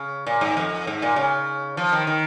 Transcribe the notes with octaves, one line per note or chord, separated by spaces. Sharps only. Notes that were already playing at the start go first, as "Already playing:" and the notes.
Already playing: C#3
A#2
G#2
F2
G#2
A#2
C#3
F3
D#3
D#3